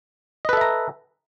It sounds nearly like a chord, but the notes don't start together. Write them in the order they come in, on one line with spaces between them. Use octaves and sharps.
D#5 B4 A4 E5 A#5